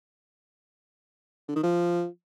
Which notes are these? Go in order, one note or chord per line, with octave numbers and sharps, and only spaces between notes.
D3
D#3
F3